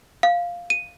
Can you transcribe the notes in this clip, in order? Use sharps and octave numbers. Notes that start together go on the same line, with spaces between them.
F5
D#7